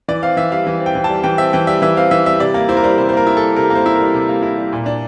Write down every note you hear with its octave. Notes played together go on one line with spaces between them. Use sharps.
E3 D5
C4 F5
E3 E5
G3 F5
E3
C4
G5
E3
A5
G3
E3 G5
C4 E5
E3 G5
G3 E5
E3 E5
C4 F5
E3 E5
G3 E5
C3 D5
A#3
E4 C5
A#4
G3 C5
C3 C5
C5
A#3 A#4
E4
G3 A4
C3 A#4
A#3
C5
E4
G3 A#4
C3
A#3
E4
G3
A#2
D4